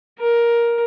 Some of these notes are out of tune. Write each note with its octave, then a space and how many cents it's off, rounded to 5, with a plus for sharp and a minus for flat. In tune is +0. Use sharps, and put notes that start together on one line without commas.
A#4 +10